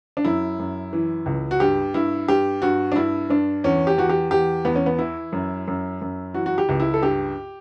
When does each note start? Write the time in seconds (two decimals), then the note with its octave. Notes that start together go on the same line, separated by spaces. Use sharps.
0.17 D4
0.25 F#2 E4
0.59 F#2
0.93 E3
1.26 C#2
1.51 F#4
1.60 G2 G4
1.94 G2 E4
2.28 G2 G4
2.62 G2 F#4
2.92 D4
2.96 G2 E4
3.29 G2 D4
3.64 E2 C#4
3.87 G4
3.98 E2 F#4
4.09 G4
4.31 E2 G4
4.65 E2 B3
4.76 C#4
4.86 B3
4.99 E3 E4
5.32 F#2
5.68 F#2
6.01 F#2
6.34 E3 F#4
6.46 F#4
6.58 G4
6.69 C#2
6.80 E4
6.94 A4
7.02 G2 G4